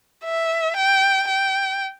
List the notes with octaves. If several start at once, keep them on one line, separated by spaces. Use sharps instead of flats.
E5
G5
G5